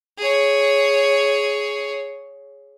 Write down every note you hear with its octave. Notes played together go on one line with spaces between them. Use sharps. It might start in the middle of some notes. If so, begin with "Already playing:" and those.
G#4 C#5